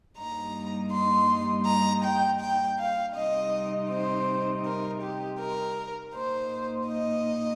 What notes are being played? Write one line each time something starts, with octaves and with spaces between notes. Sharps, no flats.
G2 G3 A#3 D#4 A#5
C6
A#5
G5
G5
F5
C3 G3 C4 D#4 D#5
C5
A#4
G4
A#4
A#2 A#3 D#4 C5
D#5